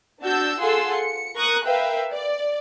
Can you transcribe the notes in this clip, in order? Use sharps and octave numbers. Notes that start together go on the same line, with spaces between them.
D4 F#4 A5 E6 G6
F4 G#4 A4 F#5 C6 E6
C#7
A#4 A#5 C#6 D#6 F#6
A#4 B4 E5 F5 G5
D5